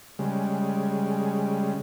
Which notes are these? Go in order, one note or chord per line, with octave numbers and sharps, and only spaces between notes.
C#3 G3 G#3